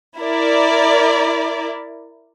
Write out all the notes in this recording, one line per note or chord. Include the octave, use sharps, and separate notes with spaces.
E4 A#4 D5